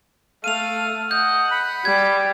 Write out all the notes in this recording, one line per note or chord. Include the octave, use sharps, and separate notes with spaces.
A3 F5 D#7 F7
D#5 F#5 G6
B5
G3 G#6